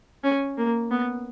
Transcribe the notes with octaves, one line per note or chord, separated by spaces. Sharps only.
C#4
A#3
B3